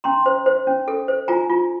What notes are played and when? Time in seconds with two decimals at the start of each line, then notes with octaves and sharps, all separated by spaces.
0.04 C#4 A#5 C6
0.26 C5
0.46 C5
0.67 C#4
0.88 A4
1.08 C5
1.28 F4 G#5 A#5
1.50 F4